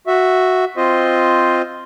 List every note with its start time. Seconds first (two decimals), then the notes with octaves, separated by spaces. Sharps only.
0.07 F#4 E5
0.77 C4 F4 C5 D#5